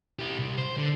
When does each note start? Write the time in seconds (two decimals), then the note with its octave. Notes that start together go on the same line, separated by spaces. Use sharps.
0.19 E4 G4
0.39 C2
0.58 C5
0.77 D3